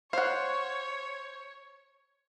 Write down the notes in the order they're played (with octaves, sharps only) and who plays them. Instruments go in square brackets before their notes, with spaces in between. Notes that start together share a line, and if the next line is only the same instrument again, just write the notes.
[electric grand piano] C5 [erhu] C#5 [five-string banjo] F5 F#5